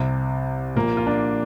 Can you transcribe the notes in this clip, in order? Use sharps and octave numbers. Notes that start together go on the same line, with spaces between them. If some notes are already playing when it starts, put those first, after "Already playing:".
Already playing: C2 C3
A#1 A#2 A#3
F4
D4